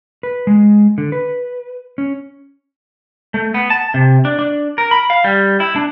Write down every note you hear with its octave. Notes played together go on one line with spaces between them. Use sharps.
B4
G#3
D3
B4
C#4
A3
B3
A5
C3
D4
D4
A#4
B5
F5
G3
E4
D4